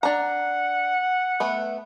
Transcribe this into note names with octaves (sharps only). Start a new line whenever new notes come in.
D4 F#5 A#5
A3 B3